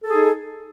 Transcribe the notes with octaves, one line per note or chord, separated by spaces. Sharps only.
D#4 G#4 A4